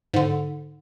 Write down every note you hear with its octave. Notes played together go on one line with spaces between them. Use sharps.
G#2 D3